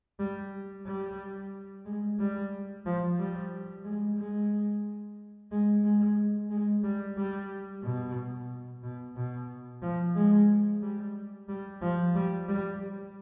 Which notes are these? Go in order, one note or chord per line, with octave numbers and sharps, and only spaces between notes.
G3
G3
G#3
G3
F3
G3
G#3
G#3
G#3
G#3
G#3
G3
G3
B2
B2
B2
F3
G#3
G3
G3
F3
G3
G3